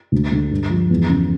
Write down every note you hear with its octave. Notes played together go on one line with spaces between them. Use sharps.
D2
D3
G2
F3
E2
C#3